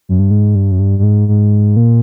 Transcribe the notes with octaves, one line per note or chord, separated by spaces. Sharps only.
F#2
G2
G#2
G2
F#2
G2
G2
G#2
G#2
A#2